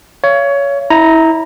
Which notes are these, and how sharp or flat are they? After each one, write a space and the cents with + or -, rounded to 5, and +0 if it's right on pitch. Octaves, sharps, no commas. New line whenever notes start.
C#5 +20 F5 -35
E4 -25 A#5 +0